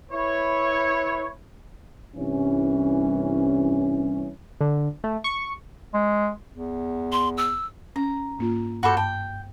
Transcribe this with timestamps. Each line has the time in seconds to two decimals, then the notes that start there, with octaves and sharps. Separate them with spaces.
0.12 E4 B4 C#5
2.16 C2 G2 E3 C#4
4.61 D3
5.04 A3
5.24 C#6
5.94 G#3
6.53 E2
7.12 C6
7.38 E6
7.96 C#4 A#5
8.39 G#2 A#3 F4
8.83 G2 F#4 A4 C5 B5 D6
8.97 G5 A5